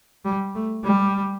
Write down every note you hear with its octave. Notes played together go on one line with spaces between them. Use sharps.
G3
A3
G3